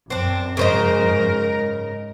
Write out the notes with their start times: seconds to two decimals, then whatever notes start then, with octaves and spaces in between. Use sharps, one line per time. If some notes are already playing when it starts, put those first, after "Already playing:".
0.10 F#2 C4 D4
0.57 G#2 C#3 A#4 C5 D#5